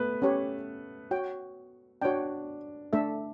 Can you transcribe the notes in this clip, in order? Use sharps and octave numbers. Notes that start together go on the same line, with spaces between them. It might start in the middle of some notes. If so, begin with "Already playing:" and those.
Already playing: A3 B3 B4
C#4 G4 C#5
F#4 C#5 G5
D4 F#4 C#5 D5 G5
A3 D4 A4 E5